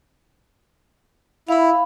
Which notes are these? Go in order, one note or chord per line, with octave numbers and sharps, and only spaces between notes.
E4 F5 B5